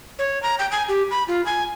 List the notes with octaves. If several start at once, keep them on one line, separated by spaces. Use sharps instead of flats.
C#5
A#5
G5
G#5
G4
B5
F4
G#5